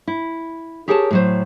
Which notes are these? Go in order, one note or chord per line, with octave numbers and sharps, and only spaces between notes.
E4
G4 G#4 A#4 C#5 G5 A5
A2 F#3 C5